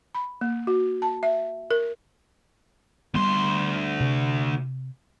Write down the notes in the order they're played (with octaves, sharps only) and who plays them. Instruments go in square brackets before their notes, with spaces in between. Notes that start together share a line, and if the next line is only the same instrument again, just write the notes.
[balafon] B5
A#3
F#4
A5
E5
A#4
[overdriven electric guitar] D2 C6 [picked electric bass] G3 G#3 B3
[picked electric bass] C3